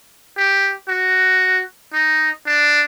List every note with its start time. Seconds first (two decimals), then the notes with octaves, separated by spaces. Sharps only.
0.37 G4
0.89 F#4
1.93 D#4
2.46 D4